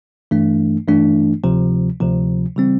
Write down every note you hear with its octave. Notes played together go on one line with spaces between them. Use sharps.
G2 E3 A3 D4
G2 E3 A3 D4
D2 C3 F3
D2 C3 F3
C#3 E3 G3 C4